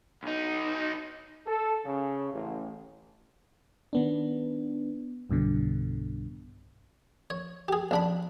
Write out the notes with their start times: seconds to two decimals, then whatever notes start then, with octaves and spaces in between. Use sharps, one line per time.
0.23 B1 D#4
1.47 A4
1.85 C#3
2.32 A1
3.93 D#3 B3 D4
5.30 B1 G2 B2 D3
7.30 C#5
7.68 G4 G#4
7.91 A#1 D4 B5